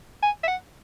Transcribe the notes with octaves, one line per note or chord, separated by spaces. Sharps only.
G#5
E5
F#5